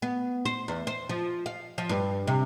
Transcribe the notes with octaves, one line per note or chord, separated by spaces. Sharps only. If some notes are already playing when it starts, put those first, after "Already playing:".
B3
C5
E2
C5
F3
F5
F3
G2
C3